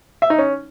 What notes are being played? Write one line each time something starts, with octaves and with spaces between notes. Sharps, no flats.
E5
D#4
C#4